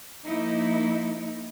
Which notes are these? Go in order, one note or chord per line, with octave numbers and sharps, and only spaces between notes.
F3 A#3 D#4 E4